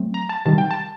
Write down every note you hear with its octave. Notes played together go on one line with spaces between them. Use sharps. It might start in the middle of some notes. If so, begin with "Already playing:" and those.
Already playing: F#3 A3 C4
A#5
A5
C3 D#3 G3 A5
G5
A5